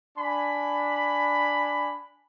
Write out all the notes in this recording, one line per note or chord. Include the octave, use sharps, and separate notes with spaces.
D4 G#5 B5